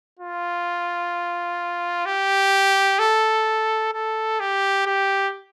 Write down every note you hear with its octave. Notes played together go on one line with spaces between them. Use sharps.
F4
G4
A4
A4
G4
G4